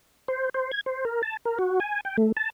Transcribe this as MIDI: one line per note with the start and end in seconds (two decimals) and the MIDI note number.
0.28 0.49 72
0.54 0.71 72
0.71 0.81 92
0.86 1.05 72
1.05 1.22 70
1.23 1.37 81
1.45 1.58 70
1.59 1.80 66
1.80 2.00 80
2.05 2.17 79
2.18 2.32 57
2.37 2.50 81